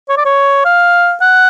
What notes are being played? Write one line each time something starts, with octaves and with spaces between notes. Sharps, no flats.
C#5
D5
C#5
F5
F#5